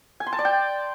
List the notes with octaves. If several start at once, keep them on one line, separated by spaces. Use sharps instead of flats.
G#5
C6
A5
D5
G5